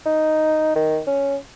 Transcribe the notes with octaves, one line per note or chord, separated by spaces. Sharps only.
D#4
D#3
C#4